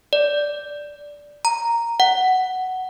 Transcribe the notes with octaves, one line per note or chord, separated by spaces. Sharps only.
D5
A#5
F#5